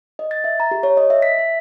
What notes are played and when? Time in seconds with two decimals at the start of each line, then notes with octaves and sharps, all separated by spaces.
0.19 D#5
0.31 A6
0.44 E5
0.60 A#5
0.71 G4
0.83 C#5
0.97 D#5
1.10 E5
1.22 B6
1.39 E5